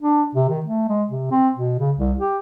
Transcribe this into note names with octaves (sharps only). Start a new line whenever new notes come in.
D4
C3
D#3
A3
G#3
C3
C4
B2
C#3
C2
G4